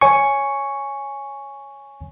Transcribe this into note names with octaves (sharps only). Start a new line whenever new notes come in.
C#5 G#5 C#6